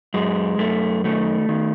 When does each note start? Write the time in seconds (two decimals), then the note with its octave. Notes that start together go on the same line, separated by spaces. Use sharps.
0.14 F#2 G#3
0.58 F#2 A3
1.04 D#3 A3
1.49 D#3